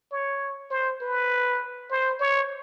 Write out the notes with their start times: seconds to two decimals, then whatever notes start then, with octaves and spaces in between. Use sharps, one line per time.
0.12 C#5
0.71 C5
1.02 B4
1.91 C5
2.20 C#5